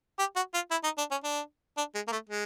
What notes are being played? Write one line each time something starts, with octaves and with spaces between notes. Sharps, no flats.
G4
F#4
F4
E4
D#4
D4
C#4
D4
D4
G#3
A#3
A3
G#3